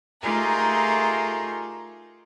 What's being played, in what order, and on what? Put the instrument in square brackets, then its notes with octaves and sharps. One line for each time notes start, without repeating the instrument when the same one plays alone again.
[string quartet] A3 D#4 F4 G4 G#4 A#4